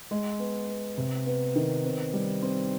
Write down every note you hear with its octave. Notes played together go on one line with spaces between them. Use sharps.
G#3
B3
B3
C3
B3
D#3
C4
G3
C4